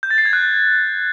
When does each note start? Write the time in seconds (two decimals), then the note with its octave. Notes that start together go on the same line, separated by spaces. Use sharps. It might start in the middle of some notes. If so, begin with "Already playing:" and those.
0.03 G6
0.10 A6
0.18 C7
0.26 G#6
0.33 F#6